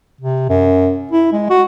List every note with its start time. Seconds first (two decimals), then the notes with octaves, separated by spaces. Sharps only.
0.21 C3
0.49 F#2
1.11 E4
1.33 G#3
1.50 F#4